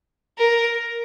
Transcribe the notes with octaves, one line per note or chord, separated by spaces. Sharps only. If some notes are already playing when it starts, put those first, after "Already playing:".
A#4